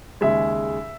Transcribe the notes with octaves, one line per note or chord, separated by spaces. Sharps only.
D#2 C#3 G#3 E5